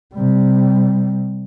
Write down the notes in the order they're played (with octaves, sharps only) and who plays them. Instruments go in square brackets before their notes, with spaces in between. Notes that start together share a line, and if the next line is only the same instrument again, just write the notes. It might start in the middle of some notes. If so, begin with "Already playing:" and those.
[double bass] C3 G3